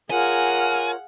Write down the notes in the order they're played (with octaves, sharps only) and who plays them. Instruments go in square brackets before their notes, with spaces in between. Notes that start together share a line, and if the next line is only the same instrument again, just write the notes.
[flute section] F4 A#4 C#5 [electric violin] G#4 F5 [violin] F#5 [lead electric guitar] G#5